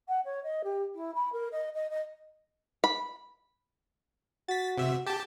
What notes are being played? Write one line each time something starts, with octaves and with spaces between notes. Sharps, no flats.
F#5
C#5
D#5
G4
E4
B5
A#4
D#5
D#5
D#5
B5
F#4 A6 B6
C3 E5
G4 A5